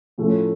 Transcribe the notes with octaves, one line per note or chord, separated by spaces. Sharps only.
A2 F3 A3 C#4